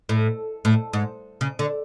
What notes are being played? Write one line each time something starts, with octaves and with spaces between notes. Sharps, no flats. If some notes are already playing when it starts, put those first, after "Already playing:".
A2
A2
G#2
C#3
D3